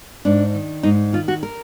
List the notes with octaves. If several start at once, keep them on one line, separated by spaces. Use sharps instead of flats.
G#2 D4
D#3
G#2 D#4
D#3 F4
F#4
A#4